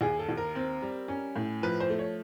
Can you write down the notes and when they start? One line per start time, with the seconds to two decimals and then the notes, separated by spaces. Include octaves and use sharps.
0.01 D#2 G#4
0.19 A4
0.29 D#2
0.37 A#4
0.55 C4
0.82 G3
1.08 C#4
1.36 A2
1.62 F3 B4
1.80 C5
1.90 A3
1.99 C#5